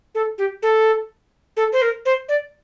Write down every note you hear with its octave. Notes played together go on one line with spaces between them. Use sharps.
A4
G4
A4
A4
C5
A#4
C5
D5